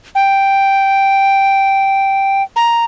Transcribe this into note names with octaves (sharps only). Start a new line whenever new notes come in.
G5
A#5